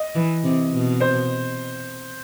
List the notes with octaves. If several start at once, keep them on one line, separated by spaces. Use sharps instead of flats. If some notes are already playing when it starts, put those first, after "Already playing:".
Already playing: D#5
E3
C3
B2
C5